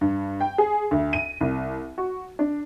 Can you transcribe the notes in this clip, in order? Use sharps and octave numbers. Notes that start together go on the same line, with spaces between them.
G2
G5
G#4
D2
D#7
C2
F#4
D4